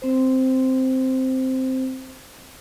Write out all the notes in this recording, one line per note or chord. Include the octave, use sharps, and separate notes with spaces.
C4 C5